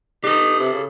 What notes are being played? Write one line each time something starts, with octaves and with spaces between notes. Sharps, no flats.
D#4 G4 A4
C3
C#3